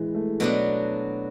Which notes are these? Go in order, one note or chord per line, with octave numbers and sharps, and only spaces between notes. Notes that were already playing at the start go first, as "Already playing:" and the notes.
Already playing: B2 E3 G#3
A3
B2 F#3 A3 B3 D4